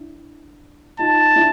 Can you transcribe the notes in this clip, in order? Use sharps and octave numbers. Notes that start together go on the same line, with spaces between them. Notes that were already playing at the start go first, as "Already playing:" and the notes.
Already playing: D4 E4
D#4 F4 A5
D4 E4